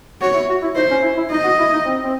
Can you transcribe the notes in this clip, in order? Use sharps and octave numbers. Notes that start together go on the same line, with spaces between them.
F#4 C#5
E4
F#4
E4
D#4 C5
C#4
E4
E4
D#4 D#5
F#4
E4
D#4
C4
C4